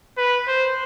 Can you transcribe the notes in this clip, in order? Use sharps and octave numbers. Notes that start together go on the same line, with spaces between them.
B4
C5